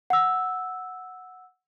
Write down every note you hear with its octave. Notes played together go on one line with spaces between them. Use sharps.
F#5 E6